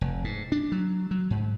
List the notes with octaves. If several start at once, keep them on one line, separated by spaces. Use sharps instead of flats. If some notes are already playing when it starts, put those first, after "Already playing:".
F1
G#2
D4
F#3
F#3
G#2